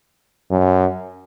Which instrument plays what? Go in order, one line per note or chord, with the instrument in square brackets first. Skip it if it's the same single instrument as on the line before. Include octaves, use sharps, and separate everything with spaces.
[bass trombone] F#2